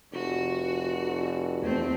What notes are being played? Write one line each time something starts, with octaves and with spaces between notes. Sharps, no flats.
F1 F#4
E2 A3 C4